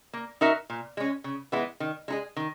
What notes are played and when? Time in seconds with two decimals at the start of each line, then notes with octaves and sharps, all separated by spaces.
0.13 A#3
0.41 D#4 F#4 A#4 E5
0.70 A#2
0.97 G#3 C#4
1.24 C#3
1.52 E3 G#3 B3 E4
1.80 D#3
2.08 G#3 D#4 G#4
2.36 D#3